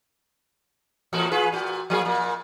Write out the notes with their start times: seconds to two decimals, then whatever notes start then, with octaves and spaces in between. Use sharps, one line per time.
1.13 E2 A2 F#4
1.32 F4 G#4 B4
1.53 A#2 F#4
1.90 F3 A#3 G#4
2.05 A#2 A#3